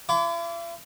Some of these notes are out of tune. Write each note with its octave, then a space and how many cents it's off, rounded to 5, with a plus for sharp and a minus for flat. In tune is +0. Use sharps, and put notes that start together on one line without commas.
E4 +45 D6 -25